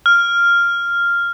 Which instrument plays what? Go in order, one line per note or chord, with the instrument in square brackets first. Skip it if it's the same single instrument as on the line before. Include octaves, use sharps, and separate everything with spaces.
[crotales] F6